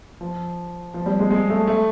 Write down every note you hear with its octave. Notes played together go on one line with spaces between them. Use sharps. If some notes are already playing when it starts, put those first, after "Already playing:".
F3
F3
G3
G#3
G#3
A3
A3